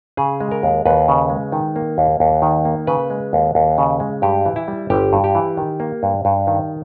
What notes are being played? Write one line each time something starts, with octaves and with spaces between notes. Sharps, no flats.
C#3 G#4
G#3
A#4
D#2
D#2 B4
C#3
G#3
D#3
A#3
D#2
D#2
D#3
A#3
C#3 B4
G#3
D#2
D#2
C#3
G#3
G2 G4
E3
E4
G3
G1 G4
G2
G4
E3
D#3
A#3
G2
G2
D#3